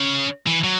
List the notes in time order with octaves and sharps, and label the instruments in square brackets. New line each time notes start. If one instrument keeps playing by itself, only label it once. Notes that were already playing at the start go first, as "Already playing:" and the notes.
Already playing: [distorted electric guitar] C#3
E3
F#3